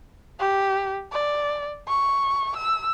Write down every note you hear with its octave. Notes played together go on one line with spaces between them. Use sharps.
G4
D5
C#6
E6